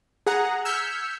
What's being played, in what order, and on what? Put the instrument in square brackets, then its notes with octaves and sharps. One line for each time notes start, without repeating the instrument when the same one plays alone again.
[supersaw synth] G#4 F#5 A#5
E6 F6 G6 G#6 B6 C#7